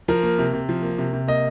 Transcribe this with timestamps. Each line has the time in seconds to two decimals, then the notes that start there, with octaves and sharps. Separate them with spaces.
0.08 F3 A#4
0.23 A#3
0.38 C3
0.53 C3
0.69 F3
0.82 A#3
0.98 C3
1.13 C3
1.28 A#3 D#5